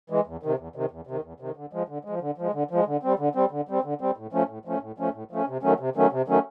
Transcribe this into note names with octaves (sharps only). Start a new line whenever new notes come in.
E3 G#3
E2
C3 D#3
E2
C3 D#3
E2
C3 D#3
E2
C3 D#3
D3
F3 G#3
D3
F3 G#3
D3
F3 G#3
D3
F3 G#3
D3
G3 C4
D3
G3 C4
D3
G3 C4
D3
G3 C4
A2
F3 A3 C#4
A2
F3 A3 C#4
A2
F3 A3 C#4
A2
F3 A3 C#4
C3
D#3 F#3 A3 C#4
C3
D#3 F#3 A3 C#4
C3
D#3 F#3 A3 C#4